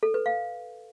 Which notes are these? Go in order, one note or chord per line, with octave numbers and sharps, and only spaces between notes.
A4
B4
F5